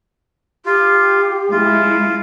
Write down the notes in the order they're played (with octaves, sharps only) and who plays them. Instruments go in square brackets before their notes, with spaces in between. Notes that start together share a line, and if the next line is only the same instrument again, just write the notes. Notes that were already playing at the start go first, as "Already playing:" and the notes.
[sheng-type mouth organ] F4 [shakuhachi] G4
[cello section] G#3 E4 [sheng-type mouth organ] F4